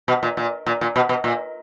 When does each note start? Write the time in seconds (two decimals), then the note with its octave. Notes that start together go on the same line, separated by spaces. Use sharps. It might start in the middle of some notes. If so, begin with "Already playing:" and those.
0.08 B2
0.23 A#2
0.37 A#2
0.66 A#2
0.81 A#2
0.96 B2
1.09 B2
1.24 A#2